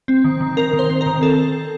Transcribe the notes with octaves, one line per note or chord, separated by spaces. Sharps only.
C4
D#3
D#3
C4 A#4
D#3
C5
C4
A#4
D#3
C4 A4